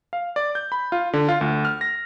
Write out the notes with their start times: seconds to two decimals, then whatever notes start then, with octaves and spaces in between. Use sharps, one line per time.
0.13 F5
0.36 D5
0.55 G6
0.72 B5
0.92 F4
1.13 D3
1.29 F4
1.41 D2
1.65 F6
1.81 A#6